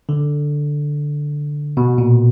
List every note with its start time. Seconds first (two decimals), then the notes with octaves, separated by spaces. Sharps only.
0.09 D3
1.77 B2
1.98 A#2